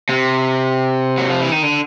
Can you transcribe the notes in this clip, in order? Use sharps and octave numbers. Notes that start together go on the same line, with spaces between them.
C3
F#3
F3
E3
D#3
D3